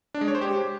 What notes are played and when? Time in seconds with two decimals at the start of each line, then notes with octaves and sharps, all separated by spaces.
0.14 D4
0.21 G#3
0.28 C#5
0.35 C5
0.41 G4